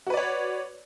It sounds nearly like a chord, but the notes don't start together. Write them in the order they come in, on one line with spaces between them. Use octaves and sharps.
F#4 B4 D5 C#5